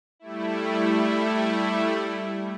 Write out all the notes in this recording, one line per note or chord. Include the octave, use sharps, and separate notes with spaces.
G3 A3 E4